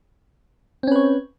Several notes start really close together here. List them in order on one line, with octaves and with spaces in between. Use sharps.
C4 C#4 B4 C#5